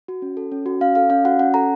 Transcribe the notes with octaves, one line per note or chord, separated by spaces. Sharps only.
F#4
C#4
A4
C#4
F#4
C#4 F5
A4 F5
C#4 F5
F#4 F#5
C#4 F#5
A4 A#5